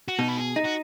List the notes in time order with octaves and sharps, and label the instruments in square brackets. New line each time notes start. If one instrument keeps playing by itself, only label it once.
[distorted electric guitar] F#4
[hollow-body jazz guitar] B2 [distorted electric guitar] D#4
[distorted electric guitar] B4
G#4
[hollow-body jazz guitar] D#4
[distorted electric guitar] F#4